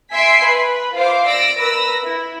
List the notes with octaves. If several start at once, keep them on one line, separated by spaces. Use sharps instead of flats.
E5 G#5 C6 B6 C7 D7
B4
F4 C5 E5 F5 D6
D5 E6 A#6 D7
A#4 B4 E6 A#6
E4